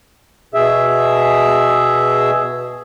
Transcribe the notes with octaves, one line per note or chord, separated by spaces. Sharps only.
B2 G#4 E5